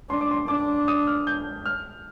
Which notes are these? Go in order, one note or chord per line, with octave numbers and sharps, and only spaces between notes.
D4 C6
D6
C6
D4 D6
D#6
F6
G6
F6